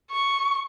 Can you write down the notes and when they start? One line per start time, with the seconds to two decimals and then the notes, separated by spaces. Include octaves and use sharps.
0.11 C#6